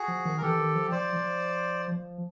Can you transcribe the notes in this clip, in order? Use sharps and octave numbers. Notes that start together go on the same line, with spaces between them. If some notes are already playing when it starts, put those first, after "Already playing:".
Already playing: F#4 G#4
F3
D#3
A#4
E3 G4 A4
D#3
F3
F3 C5 D5
F3
F3